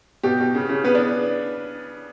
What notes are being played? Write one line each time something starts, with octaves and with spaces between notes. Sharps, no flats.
B2 G4
B2
C#3
C#3
C#3 B3 B4
D4 D5